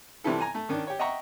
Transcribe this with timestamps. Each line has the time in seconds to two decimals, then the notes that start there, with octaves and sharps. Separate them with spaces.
0.24 C3 E3 F3 G3 E4 A4
0.40 G#5 A#5
0.55 A3
0.69 D#3 C#4 D4
0.87 G4 C#5
0.99 D#5 E5 F#5 G5 A#5 C#6